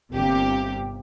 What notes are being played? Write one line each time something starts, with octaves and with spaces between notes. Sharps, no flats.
G1 C3 A#3 G4